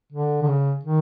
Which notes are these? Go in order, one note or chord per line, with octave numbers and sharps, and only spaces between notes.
D3
D3
C#3
D#3